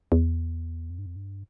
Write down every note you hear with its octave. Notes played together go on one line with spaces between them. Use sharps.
E2
F2
G2
F2
G2